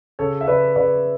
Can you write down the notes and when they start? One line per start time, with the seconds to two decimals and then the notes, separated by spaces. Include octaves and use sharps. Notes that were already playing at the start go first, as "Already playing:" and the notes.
0.19 C#3 A4 C#5
0.41 E5
0.47 C#3 B4 D5
0.76 C#3 B4 D5